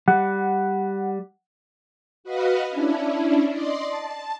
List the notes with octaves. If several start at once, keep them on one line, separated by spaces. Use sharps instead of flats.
G3 F#5
F#4 B4 D#5 F5
C#4 D4 E4
D5 D#5 C6
A5